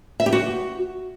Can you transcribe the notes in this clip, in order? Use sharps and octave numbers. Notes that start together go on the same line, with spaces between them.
E5
G4
F#4